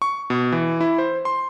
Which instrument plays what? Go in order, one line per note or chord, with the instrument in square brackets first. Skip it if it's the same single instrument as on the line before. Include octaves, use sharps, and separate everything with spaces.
[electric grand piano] C#6
B2
E3
E4
C5
C6